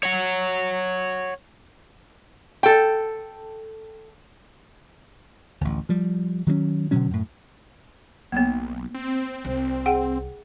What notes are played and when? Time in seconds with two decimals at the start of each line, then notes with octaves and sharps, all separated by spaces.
0.03 C#5 F#5
2.63 A4 G5
5.61 A1 D2
5.89 F3 G3
6.47 D#3 F#3 A#3 C#4
6.91 B2 D3 F#3 C#4
7.11 F#2 A2
8.32 B1 A#3 B3
8.94 C4
9.45 C2
9.86 G#4 F#5 G5